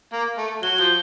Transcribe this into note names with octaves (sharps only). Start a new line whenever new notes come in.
A#3
A3
F#3 G7
F3 G7